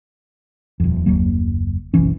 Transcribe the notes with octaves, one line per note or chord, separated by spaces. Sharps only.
D#1 F2
F#1 D#2 F#3 A#3
F#1 B1 E3 C#4